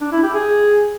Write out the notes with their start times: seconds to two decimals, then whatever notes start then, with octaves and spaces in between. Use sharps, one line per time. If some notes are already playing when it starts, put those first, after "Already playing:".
0.01 D4
0.12 E4
0.23 G4
0.34 G#4